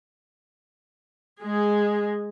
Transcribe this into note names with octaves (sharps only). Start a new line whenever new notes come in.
G#3 G#4